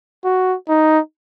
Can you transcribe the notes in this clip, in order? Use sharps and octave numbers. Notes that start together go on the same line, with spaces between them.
F#4
D#4